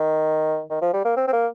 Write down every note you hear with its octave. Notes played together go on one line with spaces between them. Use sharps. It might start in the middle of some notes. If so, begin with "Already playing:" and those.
Already playing: D#3
D#3
F3
G3
A#3
C4
C4
A#3